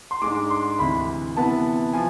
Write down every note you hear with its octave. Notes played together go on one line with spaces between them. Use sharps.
C6
G#2 G#3 D4 D6
C6
D2 C3 E3 B5
C3 E3 B3 E4 A5
F3 G#5